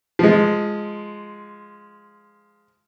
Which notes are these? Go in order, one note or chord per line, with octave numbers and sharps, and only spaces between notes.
F3 G#3